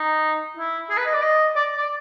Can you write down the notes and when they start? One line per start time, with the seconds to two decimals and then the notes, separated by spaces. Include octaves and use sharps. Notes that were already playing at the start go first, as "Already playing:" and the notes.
Already playing: D#4
0.57 E4
0.90 G#4
0.97 B4
1.06 D#5
1.14 D5
1.22 D#5
1.56 D5
1.77 D5